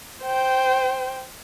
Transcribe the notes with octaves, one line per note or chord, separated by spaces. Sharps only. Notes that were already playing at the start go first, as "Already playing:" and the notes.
C5 G5